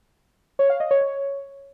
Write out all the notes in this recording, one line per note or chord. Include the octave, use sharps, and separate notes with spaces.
C#5
F5
D#5
C#5
C#5